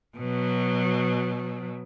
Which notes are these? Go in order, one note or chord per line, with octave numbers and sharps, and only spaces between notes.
B2 F#3